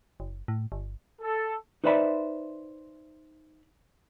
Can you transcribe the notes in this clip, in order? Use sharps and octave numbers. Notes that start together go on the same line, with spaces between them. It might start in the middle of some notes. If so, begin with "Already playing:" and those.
F#1
A2
G1
A4
D#4 B4 C5 D5 E5 B5